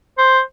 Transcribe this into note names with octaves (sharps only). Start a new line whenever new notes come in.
C5